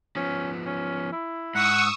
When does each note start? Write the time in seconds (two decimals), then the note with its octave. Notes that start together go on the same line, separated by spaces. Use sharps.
0.16 F3 B3 C#4
0.66 C#4
1.12 E4
1.55 G#2 F#5 C#6 D#6 E6